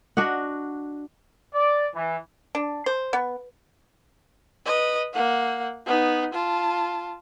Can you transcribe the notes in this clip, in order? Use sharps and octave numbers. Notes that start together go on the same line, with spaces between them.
D4 F#4 D#5 F#5
D5
E3
D4
C5
B3
B4 D#5
A#3 F#5
B3 D#4
F4 A5